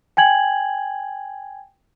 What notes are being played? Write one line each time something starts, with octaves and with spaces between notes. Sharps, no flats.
G5 G#5 G#6 F#7